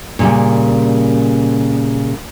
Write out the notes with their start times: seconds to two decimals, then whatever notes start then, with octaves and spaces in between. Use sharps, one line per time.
0.19 A#2 C#3 G3